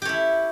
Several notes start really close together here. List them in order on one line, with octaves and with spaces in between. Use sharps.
G4 C#5 E4